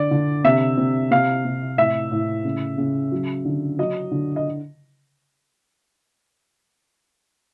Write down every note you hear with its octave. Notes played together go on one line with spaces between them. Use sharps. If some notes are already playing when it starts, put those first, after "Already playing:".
Already playing: D3 D5
D3
C3 E5
C3
C3 F5
C3
A2 E5
A2
C#3
C#3
F#3
D3
F#3 D#5
D3
D#5